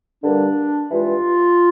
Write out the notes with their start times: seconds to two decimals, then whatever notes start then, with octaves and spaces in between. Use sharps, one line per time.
0.23 G2 D3 G3 A#3 D4
0.91 G2 E3 G#3 F4